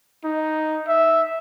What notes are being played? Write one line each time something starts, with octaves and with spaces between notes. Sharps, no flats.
D#4
E5